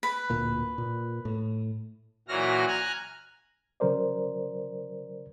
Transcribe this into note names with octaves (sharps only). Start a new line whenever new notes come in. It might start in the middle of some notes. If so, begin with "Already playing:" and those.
B4 B5
D1 A#2 A#3
A#2
A2
A#2 E3 F#3 F#4 F6 A#6
G#5 A#5 F6 F#6
C#3 F#3 A#4 C5 D5